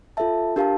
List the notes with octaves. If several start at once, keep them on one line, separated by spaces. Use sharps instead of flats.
F4 A4 E5 A5
D4 G4 A#4 F5 A5